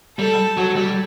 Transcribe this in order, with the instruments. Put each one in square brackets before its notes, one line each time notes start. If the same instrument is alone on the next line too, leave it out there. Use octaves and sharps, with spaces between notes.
[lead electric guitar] G3 [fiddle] A4
[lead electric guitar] F#3
G3